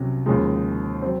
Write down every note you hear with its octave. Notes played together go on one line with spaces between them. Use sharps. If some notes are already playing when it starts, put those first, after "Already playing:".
Already playing: C2 C3 F#3 C#4 F#4
D#2 C#3 F3 G#3 D#4
F#3 C4